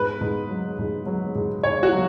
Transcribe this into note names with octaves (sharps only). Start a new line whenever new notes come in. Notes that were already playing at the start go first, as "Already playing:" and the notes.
Already playing: G#2 B4
G#2
F#3
G#2
F#3
G#2
G#2 C#5
F#4
F#3